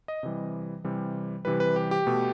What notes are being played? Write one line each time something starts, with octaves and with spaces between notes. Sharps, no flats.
D#5
C3 E3 G3
C3 E3 G3
C3 E3 G3 B4
B4
G4
G4
B2 A3